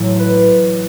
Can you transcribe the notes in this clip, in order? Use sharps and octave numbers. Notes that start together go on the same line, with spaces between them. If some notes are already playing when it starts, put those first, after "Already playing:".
Already playing: A1 A2 F#3 A3
B4
D5